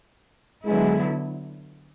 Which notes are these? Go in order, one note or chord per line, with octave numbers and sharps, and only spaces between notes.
D3 F#3 G#3 B3 E4